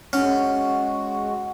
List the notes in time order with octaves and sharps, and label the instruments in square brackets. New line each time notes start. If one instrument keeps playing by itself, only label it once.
[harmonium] G#3 F#4 [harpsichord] C#4 [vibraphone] F#5